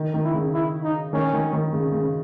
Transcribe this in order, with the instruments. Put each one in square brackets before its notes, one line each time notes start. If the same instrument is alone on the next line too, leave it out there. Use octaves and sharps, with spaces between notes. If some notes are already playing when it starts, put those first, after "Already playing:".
Already playing: [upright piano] D#3
D#3
[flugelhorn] E4
[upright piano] C#3
[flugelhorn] E4
D#4
[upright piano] D#3 [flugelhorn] C#4
[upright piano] D#3
D#3
C#3
C#3